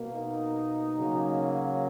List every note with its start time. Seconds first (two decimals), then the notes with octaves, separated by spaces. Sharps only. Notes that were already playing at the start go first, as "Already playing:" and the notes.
Already playing: B2 A#3
0.13 D#4
0.96 C#3 F#3 A#3